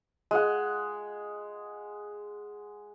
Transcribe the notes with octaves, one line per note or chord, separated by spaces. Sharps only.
G#3 F#5